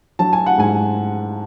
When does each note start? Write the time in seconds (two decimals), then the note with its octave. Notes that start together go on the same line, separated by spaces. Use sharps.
0.19 F#3 A5
0.33 G#5
0.46 F#5
0.58 G#2 G#5